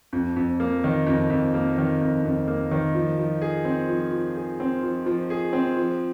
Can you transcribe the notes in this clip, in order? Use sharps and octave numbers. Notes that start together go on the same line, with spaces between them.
F2
F2
A#3
D#3
F2
F2
A#3
D#3
F2
F2
A#3
D#3
F3
F3
G#4
C4
F3
F3
G#4
C4
F3
F3
G#4
C4
F3